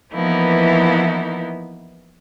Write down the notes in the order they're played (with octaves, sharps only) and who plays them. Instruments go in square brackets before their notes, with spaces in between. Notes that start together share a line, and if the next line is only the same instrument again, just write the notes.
[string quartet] E3 F3 A#3 B3 D#4 E4